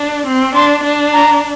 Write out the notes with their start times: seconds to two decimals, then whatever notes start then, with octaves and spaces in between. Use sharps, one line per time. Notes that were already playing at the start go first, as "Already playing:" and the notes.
Already playing: D4
0.27 C4
0.55 D4 C6
0.84 D4
1.13 A#5